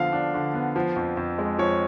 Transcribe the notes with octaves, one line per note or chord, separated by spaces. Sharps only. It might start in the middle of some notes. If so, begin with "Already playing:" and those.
Already playing: D3 F3 B3 D4 F5
D4
D3
B3
F3
F2
F2
G#3
F3 C#5